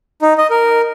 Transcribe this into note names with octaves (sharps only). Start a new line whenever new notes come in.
D#4
D#5
A#4